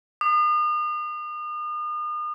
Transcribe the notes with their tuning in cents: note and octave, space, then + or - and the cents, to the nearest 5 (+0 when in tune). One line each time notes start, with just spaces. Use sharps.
D#6 -40